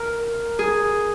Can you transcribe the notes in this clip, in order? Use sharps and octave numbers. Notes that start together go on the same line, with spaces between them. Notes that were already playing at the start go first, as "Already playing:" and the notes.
Already playing: A#4
G#4